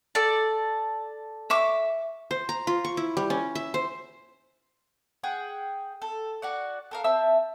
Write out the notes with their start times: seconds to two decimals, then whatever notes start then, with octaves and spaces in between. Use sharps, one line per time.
0.15 A4 D5
1.50 E5 C#6 D6
2.31 C5
2.49 A#5
2.67 F4
2.85 C#6
2.97 E4
3.17 G3
3.30 C#4
3.55 E5
3.74 C5
5.23 G#4 F#5 G5
6.02 A4
6.42 F#4 D5 F#5
6.91 A4 A#4 F5
7.04 C4 E5 A5 E6